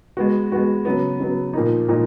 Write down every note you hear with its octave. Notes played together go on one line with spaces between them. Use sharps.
G#3 B3 F#4
G#3 B3 F#4
C#3 F#3 B3
C#3 F#3 B3
A#2 F3 A#3 D#4
A#2 F3 A#3 D#4